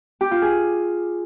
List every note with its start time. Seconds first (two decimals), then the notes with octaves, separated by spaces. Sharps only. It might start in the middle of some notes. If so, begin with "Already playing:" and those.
0.21 G4
0.31 F4
0.42 G#4